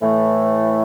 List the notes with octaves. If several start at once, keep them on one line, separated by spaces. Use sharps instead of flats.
A2 E3 A3